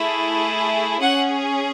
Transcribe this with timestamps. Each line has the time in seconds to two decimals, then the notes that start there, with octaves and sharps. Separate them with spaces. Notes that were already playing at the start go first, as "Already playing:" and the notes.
Already playing: A3 E4 G#4
1.01 C#4 G#4 F#5